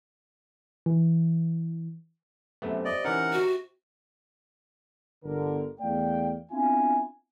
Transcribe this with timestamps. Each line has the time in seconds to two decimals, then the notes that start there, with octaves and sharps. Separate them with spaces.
0.86 E3
2.62 F#2 C3 A3 B3
2.85 D5 D#5
3.05 E3 C#4 D#4 A#4 F#5
3.33 F#4
5.24 G1 D3 A#4
5.81 E2 A3 D5 F5 G5
6.52 B3 C4 D4 E4 F4 G#5